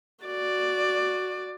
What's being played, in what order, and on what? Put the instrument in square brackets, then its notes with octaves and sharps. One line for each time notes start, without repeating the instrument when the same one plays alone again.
[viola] F#4 D5